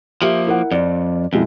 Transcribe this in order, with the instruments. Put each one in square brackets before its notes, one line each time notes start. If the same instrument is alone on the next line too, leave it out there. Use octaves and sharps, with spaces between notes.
[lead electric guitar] F3 A#3 [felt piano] G4 E5
[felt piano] E4 A#4 F#5
[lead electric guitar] F2 [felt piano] D5
[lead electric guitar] F2 [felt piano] B2 G#3 E4